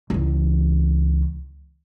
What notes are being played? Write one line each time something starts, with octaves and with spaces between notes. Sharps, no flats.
C#2 E3